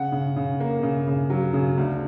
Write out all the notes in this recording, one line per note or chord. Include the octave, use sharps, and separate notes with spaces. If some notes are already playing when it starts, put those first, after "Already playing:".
Already playing: C#3 F#5
C#3
C#3
A#3
C#3
C#3
F#3
C#3
D2